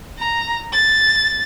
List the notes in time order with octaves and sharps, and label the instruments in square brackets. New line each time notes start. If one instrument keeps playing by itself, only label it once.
[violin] A#5
A6